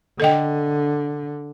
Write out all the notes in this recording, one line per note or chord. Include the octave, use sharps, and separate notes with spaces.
D3 A4 D#5 G5